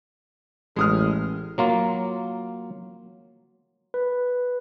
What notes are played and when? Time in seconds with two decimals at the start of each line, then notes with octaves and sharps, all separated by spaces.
0.76 A1 G#3 D#6 F6
1.58 F#3 A#3 F4
3.94 B4